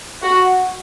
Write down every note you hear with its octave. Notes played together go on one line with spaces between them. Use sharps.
F#4